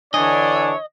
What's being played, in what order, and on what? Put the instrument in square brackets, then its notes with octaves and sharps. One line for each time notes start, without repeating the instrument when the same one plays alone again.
[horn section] D3 E3 D4 [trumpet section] C#5 [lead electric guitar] D#5 [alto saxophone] G#5